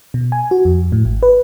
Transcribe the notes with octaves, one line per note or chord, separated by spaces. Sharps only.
B2
G#5
F#4
F2
A2
G#1
B4